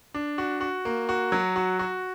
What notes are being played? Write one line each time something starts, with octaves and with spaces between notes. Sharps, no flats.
D4
F#4
F#4
A#3
F#4
F#3
F#4
F#4